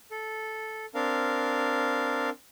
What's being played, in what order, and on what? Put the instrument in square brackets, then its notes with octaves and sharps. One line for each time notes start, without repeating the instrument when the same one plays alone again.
[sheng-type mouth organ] A4
C4 D4 A#4 F5